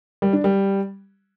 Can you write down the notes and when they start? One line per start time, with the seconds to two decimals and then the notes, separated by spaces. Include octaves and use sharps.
0.22 G3
0.33 D4
0.44 G3